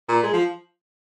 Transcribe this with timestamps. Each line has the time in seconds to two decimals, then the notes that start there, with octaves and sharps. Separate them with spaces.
0.09 A#2
0.23 G#3
0.33 F3